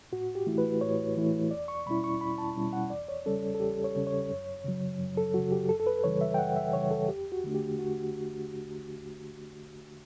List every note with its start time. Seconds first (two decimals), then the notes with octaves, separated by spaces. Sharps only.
0.12 A2 F#4
0.35 G4
0.47 E3 A3 E4
0.58 B4
0.81 A2 C#5
1.17 E3 A3 E4
1.51 E2 D5
1.68 C#6
1.86 B2 G3 C#4 E4 B5
2.04 C#6
2.21 E2 B5
2.38 A5
2.56 B2 G3 C#4 E4
2.73 F#5
2.90 E2 D5
3.08 C#5
3.26 C#3 G3 C#4 A4
3.55 A4
3.60 E2 G4
3.84 C#5
3.95 C#3 G3 C#4
4.07 C#5
4.30 F#2
4.64 C#3 F#3
5.00 F#2
5.17 A4
5.34 C#3 F#3 F#4
5.52 G4
5.69 F#2 A4
5.80 A4
5.87 B4
6.04 C#3 E3 G3 C#5
6.21 E5
6.34 G5
6.39 F#2 F#5
6.56 E5
6.73 C#3 E3 G3 C#5
6.91 A4
7.09 E2 G4
7.32 F#4
7.44 D3 A3 D4
7.55 G4
7.79 F#4